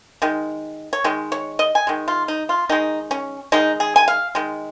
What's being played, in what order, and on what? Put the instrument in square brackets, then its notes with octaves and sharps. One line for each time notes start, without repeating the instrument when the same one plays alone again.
[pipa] D#3 G#3
C#5
D#3 G#3
C#5
D#5
G#5
D#3 G#3
F4
D#4
F4
D#3 G#3 D#4
C#4
D#3 G#3 D#4
G#4
G#5
F5
D#3 G#3